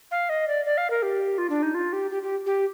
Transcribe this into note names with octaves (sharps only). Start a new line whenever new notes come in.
F5
D#5
D5
D5
F5
A#4
G4
F4
D4
D#4
F4
G4
G4
G4
G4